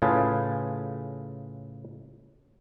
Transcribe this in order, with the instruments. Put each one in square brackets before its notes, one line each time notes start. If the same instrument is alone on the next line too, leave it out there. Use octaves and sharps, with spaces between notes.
[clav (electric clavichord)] A2 C#3 F4 G#4 B4 A5